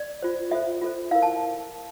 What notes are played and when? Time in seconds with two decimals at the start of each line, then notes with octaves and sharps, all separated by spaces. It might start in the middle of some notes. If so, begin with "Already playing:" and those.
Already playing: D5
0.23 F4 C5
0.51 F4 A4 C5 E5
0.82 F4 A4 C5
1.11 E4 A#4 F5
1.22 A5